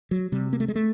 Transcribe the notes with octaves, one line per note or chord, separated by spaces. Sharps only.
F#3
C3 G3
A#3
A3
G#3
A3